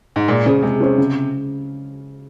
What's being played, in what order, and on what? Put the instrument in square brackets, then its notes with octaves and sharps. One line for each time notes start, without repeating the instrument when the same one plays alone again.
[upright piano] G#2
[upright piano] A#2 [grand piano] G#3
[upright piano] C#3 [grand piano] C#4 G#4 C5
[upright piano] C3 [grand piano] G#3
[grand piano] C#4 G#4 C5
C#3